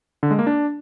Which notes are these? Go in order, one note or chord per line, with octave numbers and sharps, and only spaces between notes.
D3
G#3
A#3
D4